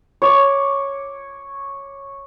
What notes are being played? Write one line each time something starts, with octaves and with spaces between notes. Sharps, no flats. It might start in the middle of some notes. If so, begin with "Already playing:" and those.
C#5 D6